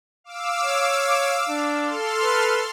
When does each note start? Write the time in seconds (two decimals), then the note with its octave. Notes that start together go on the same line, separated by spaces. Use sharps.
0.24 F5 D6 E6
0.64 C#5
1.49 D4
1.81 A4 C6 F6
2.23 B4